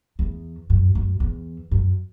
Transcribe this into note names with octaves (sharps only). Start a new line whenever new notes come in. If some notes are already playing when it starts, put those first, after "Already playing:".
E2
F#2
F#2
E2
F#2